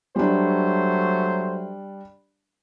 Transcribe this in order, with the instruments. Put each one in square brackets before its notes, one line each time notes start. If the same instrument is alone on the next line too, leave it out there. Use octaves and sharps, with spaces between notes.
[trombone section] F#3 A3 C5 [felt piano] G3 D4